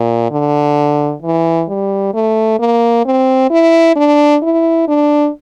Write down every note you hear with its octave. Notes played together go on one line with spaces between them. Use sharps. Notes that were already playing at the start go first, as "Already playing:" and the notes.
Already playing: A#2
D3
E3
G3
A3
A#3
C4
E4
D4
E4
D4